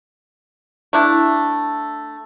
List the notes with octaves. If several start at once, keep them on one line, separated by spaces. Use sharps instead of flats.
A3 D4 E4